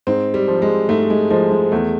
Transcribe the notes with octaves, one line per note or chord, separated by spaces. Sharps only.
G#2 C4
G3
F3
G#3
G#2 A3
G#3
F3 G#3
G#3
E2 A3